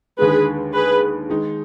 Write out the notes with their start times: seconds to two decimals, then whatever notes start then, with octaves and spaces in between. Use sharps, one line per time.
0.18 D#2 D3 G#3 G#4 B4
0.74 G#4 B4
1.30 D#3 G#3 D#4